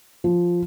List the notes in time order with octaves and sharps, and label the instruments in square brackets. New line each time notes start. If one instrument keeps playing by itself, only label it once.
[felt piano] F3